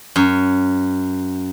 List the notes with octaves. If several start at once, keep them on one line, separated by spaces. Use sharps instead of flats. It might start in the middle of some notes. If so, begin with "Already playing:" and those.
F#2